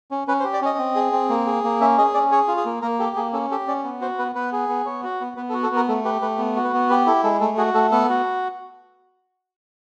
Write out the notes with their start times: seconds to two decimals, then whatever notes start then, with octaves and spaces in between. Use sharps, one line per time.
0.11 C#4
0.28 C#4 B4
0.40 C5
0.44 G4
0.53 D5
0.61 C#4 D#5
0.78 C4
0.95 G#4
1.12 C4
1.30 A#3
1.46 G#4
1.64 A#3
1.80 C#4 E5
1.98 G#4 D#5
2.14 C#4 D5
2.32 G#4 C#5
2.48 F4
2.57 G#4
2.66 A#3
2.82 A#3 A#4
2.99 G4 A4
3.16 A#3 G#4
3.33 C#4 A4
3.51 G4 A4
3.67 C#4 D5
3.84 B3
4.01 F#4 C5
4.18 B3 B4
4.35 B3 B4
4.52 G#4
4.69 B3
4.86 B3 C#5
5.04 F#4
5.20 B3
5.37 B3 B4
5.49 A4
5.54 F#4
5.63 A4
5.71 B3 A#4
5.89 A3 A4
6.05 G4 B4
6.22 A3 B4
6.39 B3
6.56 F#4
6.64 B4
6.74 B3
6.90 G4 B4
7.06 E4 A4
7.24 G#3 A4
7.41 A3 A4
7.57 F#4 G#4
7.74 A3 A4
7.92 B3 A4
8.10 F#4